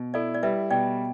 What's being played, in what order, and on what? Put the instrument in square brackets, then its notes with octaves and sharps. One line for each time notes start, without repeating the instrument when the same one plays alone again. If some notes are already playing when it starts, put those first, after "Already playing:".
Already playing: [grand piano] B2
[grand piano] E4 [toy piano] A4 D5
[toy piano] D5
[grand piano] G3 [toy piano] B4 E5
[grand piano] B2 [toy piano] D5 G5